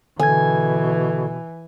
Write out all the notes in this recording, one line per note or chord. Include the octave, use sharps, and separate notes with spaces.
B2 D3 E3 A4 G#5 G#6